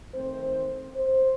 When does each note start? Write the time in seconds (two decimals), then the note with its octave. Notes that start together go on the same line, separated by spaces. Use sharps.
0.13 D#3 A3 C4 C5
0.96 C5